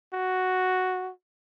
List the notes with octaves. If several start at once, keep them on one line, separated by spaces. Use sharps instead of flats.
F#4